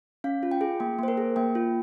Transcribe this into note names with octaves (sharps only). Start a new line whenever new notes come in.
C#4 F5
F4
G5
G#4
A#3 G5
A#3 C5
A#4
G#4
A#3 G5
F4